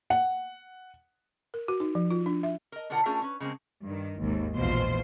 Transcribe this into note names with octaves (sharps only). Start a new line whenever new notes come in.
F#5
A#4
F#4
D#4
F3
F4
D4
E5
A#4 D#5
B2 D3 D4 F4 A#4 F#5
A3 C#4 D4 F4 G#4 A#4
C#4 B4
C#3 G#3 A#3 C4
G2 D#3
G#1 D#2 G#2
A#1 E2 B2 F4 C5 C6